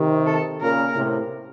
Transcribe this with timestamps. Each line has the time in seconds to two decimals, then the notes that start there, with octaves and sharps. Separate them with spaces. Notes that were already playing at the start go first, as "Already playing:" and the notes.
Already playing: C3 D#3
0.26 A4
0.61 A#2 C#3 A#4
0.96 A2 C3